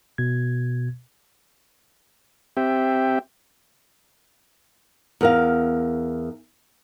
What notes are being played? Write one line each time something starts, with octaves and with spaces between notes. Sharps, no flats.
B2 G#6
C4 G4 E5 G5
E2 A#4 F5